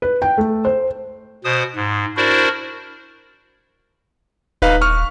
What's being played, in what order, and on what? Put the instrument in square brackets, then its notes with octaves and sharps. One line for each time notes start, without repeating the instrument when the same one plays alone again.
[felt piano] B4
G5
A3
C5
[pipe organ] B2 C5 D#6
G#2
D4 E4 F#4 A#4 C5 D5
[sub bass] D#1 [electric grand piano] D#4 B4 F5
[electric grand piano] C#6 F6